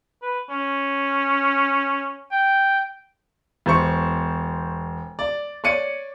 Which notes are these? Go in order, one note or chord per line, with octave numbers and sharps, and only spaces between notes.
B4
C#4
G5
E1 C5 C#6
D5
C#5 D5 C#7 D#7